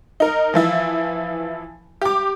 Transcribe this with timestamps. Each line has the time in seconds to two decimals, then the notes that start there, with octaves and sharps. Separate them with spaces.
0.20 D#4 A#4
0.54 E3 F3 E4
2.01 G4 D6